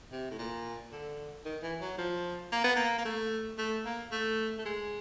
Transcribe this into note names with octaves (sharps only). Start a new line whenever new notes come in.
C3
A2
A#2
D3
D#3
E3
F#3
F3
A#3
B3
A#3
A#3
A3
A3
A#3
A3
A3
G#3